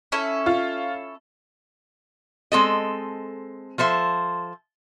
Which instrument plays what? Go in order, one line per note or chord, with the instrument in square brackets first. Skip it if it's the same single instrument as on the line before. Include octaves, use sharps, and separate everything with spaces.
[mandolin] C#4 E4 A4
[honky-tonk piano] F4
[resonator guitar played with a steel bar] G#3 C4 A4 D#5
F3 A4 C5 E5